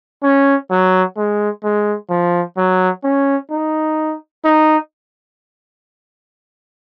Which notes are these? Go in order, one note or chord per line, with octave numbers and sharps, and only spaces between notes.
C#4
F#3
G#3
G#3
F3
F#3
C#4
D#4
D#4